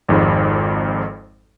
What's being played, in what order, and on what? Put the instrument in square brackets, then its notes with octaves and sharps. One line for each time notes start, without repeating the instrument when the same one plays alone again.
[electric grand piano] G#1 F2 G#2